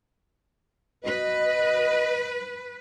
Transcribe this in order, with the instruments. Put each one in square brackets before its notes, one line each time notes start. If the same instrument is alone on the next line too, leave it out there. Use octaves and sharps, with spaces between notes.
[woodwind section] B2 D#5 [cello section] B4